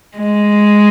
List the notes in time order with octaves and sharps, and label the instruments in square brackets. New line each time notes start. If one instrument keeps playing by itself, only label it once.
[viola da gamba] G#3